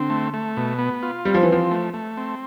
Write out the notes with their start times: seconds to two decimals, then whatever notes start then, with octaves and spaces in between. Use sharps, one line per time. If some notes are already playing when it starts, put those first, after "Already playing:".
Already playing: D3 C4
0.10 A3
0.34 A3
0.57 B2
0.79 B3
1.03 F4
1.25 G3 C4
1.34 F3
1.43 E3
1.48 F3 C4
1.71 A3
1.94 A3
2.17 C4